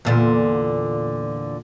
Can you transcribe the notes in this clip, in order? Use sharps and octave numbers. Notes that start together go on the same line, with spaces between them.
E2 A#2 D3